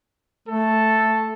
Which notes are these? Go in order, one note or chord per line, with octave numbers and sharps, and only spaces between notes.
A3 A4